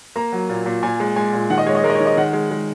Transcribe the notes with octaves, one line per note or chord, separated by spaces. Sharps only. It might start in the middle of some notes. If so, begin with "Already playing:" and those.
A#3 A#5
F#3
A#2
A#2
A#2 G#5
G#3
G#3 G#5
A#2
D#3 F#5
D#5
G#3 C#5
D#5
G#3 A#4
D#5
C#5
D#3
D#5
D#3 F#5
G#3
G#3